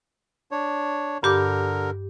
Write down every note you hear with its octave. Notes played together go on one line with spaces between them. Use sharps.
D4 C#5
G2 D3 G4 A#4 D6